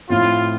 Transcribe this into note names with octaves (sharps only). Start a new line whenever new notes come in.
A2 F3 C4 E4 F4